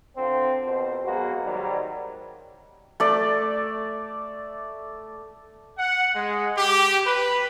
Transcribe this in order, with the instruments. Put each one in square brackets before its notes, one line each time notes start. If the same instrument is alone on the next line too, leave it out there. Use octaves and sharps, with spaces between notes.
[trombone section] D3 F3 C4
A#1 B2 C5
F#3 G#3 A#3 B3 F#4
G#2 D#3 F#3 G3
[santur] A3 D5
[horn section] F#5
G#3
G4
B4